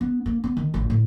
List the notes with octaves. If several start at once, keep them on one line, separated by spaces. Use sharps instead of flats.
B3
A#3
B3
D#3
A1
A2